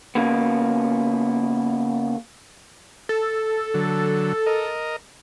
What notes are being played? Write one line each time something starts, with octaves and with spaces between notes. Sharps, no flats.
C#3 A#3 B3
A4
D3 F#3
A#4 D#5